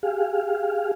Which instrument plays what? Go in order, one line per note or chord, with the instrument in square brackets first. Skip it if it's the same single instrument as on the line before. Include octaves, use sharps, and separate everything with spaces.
[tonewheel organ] G4 G#4 F5